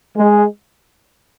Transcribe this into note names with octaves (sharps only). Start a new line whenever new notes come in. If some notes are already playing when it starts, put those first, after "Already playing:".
G#3